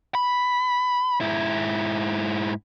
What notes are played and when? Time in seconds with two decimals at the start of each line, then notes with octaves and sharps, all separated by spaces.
0.15 B5
1.21 G#2 E4